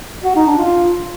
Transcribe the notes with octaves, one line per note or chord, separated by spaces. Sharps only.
F#4
D#4
D4
F4